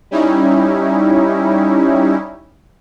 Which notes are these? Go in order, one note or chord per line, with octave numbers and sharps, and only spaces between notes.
G3 C#4 D#4 E4